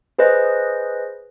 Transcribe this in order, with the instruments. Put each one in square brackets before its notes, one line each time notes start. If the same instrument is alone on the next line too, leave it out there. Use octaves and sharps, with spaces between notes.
[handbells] G#4 B4 C5 D#5